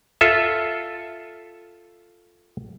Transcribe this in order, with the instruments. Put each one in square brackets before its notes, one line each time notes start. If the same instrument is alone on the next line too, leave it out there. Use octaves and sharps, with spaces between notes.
[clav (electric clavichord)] F4 A4 E5